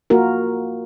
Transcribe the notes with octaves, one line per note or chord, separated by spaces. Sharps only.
A#3 F4 F#4 A#4